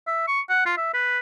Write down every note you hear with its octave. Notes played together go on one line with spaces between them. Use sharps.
E5
C#6
F#5
F4
E5
B4